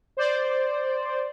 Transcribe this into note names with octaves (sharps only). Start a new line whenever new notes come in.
C5 D5